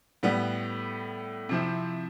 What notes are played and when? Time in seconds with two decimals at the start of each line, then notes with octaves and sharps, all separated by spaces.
0.23 A2 G3 B3
1.49 C3 F3 C4 E4